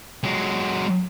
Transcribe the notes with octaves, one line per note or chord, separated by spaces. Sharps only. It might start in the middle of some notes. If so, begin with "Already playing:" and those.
F#3 G#3